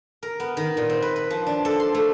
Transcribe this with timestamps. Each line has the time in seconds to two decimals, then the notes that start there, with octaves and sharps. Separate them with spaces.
0.23 A#4
0.40 B3
0.57 D#3
0.77 A#2
0.89 C4
1.02 B4
1.16 B4
1.30 F3
1.47 D4
1.65 A4
1.80 C6
1.95 A3